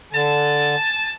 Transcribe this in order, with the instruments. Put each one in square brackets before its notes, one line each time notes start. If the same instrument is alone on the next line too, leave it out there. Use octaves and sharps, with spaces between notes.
[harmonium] D3 [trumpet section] G#5 A5